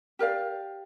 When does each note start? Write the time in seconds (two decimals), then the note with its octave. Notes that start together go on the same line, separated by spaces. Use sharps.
0.19 G4 A#4 D5 F5